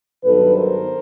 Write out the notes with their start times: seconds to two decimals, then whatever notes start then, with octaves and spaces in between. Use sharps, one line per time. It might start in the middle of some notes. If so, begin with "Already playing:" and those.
0.24 G2 D#3 F#3 B3 D#4 A4 B4
0.56 A#4 C5